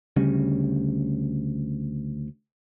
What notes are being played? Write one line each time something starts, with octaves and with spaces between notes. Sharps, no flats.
D2 C#3 G3 C#4